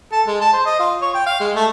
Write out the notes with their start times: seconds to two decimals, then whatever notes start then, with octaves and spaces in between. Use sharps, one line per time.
0.12 A4
0.27 G#3
0.41 A5
0.53 C5
0.66 D#5
0.79 F4
1.02 C#5
1.14 G5
1.26 F5
1.40 G#3
1.55 A3